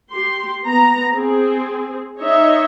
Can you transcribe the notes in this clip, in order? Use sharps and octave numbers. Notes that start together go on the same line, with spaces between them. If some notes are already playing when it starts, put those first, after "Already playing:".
G4 C6
B3 A#5
C4 G#4
D#4 C#5 D#5 E5